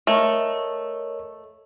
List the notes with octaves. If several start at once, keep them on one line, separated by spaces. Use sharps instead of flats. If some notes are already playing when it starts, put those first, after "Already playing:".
A3 A#4 C#5 D#5